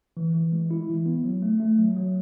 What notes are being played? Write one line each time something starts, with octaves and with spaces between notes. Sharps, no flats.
E3
E3
G#3
E4
E3
B3
F#3
A3
A3
F#3
F#3